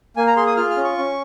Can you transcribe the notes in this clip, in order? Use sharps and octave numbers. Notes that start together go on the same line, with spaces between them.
A#3 G#5
A#5
G#4 C6
D#6
F4 F6
F6
C#4
C#6
C#4